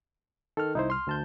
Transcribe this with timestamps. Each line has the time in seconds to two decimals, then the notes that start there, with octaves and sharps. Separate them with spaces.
0.57 D#3 A4 F6
0.75 C2 D#4 E4 C5
0.90 C6 F6
1.07 D2 A5 G6